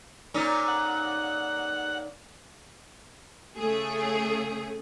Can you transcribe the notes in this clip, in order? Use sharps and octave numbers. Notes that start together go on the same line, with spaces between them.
A#2 C#4 D#4
F#5
C#3 A3 G#4